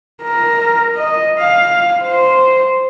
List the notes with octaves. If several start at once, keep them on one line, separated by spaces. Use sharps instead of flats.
A#4
D#5
F5
C5